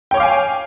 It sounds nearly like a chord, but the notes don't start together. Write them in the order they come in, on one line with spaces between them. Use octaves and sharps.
G5 C#5 D6 F5 G#5